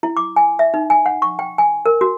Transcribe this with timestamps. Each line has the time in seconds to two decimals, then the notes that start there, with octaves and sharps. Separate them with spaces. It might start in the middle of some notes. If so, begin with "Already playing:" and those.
0.03 E4
0.17 D6
0.36 G#5
0.59 E5
0.74 D#4
0.90 G#5
1.06 F#5
1.22 C#6
1.39 G5
1.58 G#5
1.86 A#4
2.01 F#4